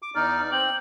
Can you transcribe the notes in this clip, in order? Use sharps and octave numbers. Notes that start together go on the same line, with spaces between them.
D6
E2 D#4 D5 F6
C4 G5 F#7